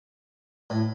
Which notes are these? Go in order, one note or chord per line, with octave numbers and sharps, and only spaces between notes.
A2